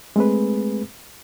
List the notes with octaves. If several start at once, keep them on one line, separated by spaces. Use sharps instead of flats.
G#3 A3 C4 G#4 B4